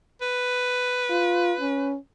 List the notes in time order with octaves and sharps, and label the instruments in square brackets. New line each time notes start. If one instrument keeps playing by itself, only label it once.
[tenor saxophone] B4
[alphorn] F4
C#4